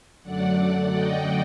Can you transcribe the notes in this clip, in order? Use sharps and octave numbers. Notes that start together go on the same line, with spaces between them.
F#2 D3 F#3 A3 D5 F#5
D#5 G5